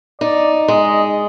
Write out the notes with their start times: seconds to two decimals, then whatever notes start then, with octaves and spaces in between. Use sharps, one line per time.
0.21 D#4 D5
0.68 G#3 D#5